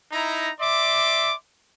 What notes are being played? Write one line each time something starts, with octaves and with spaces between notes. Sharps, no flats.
D#4 E4 A#5
D5 E5 C6 D6